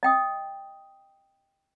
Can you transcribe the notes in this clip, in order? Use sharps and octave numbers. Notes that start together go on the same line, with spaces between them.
D#5 G5 D#6